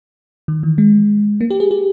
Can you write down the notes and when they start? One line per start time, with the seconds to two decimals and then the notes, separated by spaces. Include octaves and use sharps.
0.48 D#3
0.63 E3
0.78 G#3
1.41 A#3
1.50 G4
1.60 G#4
1.71 G4